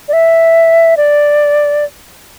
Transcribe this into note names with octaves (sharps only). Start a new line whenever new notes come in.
D5
E5
D5